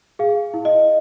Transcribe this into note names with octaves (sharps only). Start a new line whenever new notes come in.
G#4 F5
E4
D#5